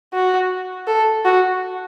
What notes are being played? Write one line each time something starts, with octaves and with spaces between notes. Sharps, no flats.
F#4
A4
F#4